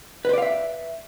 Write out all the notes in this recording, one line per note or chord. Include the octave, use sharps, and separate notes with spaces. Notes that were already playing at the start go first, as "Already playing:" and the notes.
B4 C5 D5 E5 F5